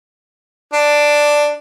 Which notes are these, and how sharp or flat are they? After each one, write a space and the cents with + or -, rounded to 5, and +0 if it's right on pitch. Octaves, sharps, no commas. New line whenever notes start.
D4 +5